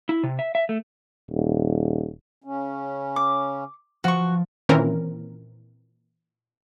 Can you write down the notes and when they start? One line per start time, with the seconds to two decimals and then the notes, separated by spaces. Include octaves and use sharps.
0.09 E4
0.23 C3
0.39 E5
0.55 E5
0.69 A3
1.30 D#1
2.44 C#3 C#4
3.16 D6
4.04 F3 F#4 C#6
4.69 A#2 D#3 E3 C4 C#4 A#4